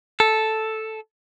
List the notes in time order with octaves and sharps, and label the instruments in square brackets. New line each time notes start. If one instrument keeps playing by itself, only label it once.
[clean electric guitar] A4